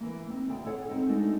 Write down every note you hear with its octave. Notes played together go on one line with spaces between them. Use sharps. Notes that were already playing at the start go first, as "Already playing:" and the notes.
E3 A#3
C4 D#4
D2 G5
G#4 A4 C#5 F#5
C4 D#4
G#3 A3 D4 D#4 F#4 A4